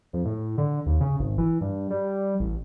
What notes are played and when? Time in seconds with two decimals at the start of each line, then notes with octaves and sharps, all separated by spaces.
0.13 F2
0.25 A2
0.58 D3
0.86 D#2
1.01 C#3
1.20 G#1
1.38 E3
1.61 G2
1.91 G3
2.40 A1